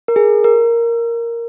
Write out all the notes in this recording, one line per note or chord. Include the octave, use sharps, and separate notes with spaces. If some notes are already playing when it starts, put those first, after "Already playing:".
A#4
G#4
A#4